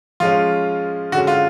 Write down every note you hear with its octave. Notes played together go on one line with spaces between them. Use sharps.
F3 G#3 C#4 F4
D3 G#3 C#4 F#4
F4